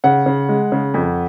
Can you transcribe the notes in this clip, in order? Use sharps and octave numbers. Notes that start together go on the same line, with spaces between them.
C#3 F#5
C#3
G#3
C#3
F2